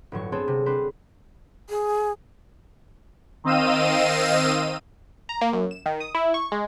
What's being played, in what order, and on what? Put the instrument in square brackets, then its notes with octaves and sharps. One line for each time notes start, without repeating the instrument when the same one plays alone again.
[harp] G1 A2 F#3 C#6
B3 C4 G#4 A4 C5 C#5
C3
C4 D4 B4 C5
[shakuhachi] G#4
[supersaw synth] D#3 C4 D#5 F5 E6 D#7
[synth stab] A#5
A#3
F#2
E7
D#3
D#6
E4
C#6
G#3